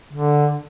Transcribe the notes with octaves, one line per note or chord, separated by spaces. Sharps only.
D3